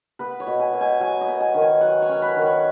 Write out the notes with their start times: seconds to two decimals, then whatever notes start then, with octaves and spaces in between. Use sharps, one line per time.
0.19 B3 B4
0.40 C#5
0.47 B2
0.60 G#5
0.73 B2
0.81 G#5
1.00 F#3 G#5
1.21 D#5
1.28 B3
1.40 G#5
1.54 D#3
1.62 G#5
1.81 F#3 F#5
2.02 C#5
2.09 C#4
2.22 B4
2.35 D#3
2.42 C#5